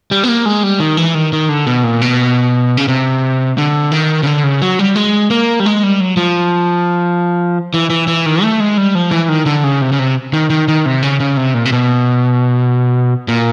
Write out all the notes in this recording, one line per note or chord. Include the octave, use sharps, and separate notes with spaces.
G3
B3
A#3
G#3
G3
D#3
E3
D#3
D#3
D3
B2
A#2
B2
C#3
C3
D3
D#3
C#3
D3
C#3
F#3
G3
G#3
A#3
G3
G#3
G3
F#3
F3
E3
E3
E3
D#3
A3
G#3
G3
F3
E3
D#3
D3
C#3
C3
C#3
C3
D#3
D#3
D#3
C3
C#3
C#3
C3
A#2
C3
B2
A#2